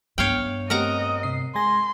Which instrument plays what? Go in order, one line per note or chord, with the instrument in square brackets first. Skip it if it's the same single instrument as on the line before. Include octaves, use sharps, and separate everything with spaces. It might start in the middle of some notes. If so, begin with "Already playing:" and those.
[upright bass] G2 B3 [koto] C#5 F5 G5
[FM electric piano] A3 C4 G4 [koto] A#4 F#5 A#5 [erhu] D#5
[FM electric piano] C3 C7
[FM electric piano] G#3 G#5 A#6 [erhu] C6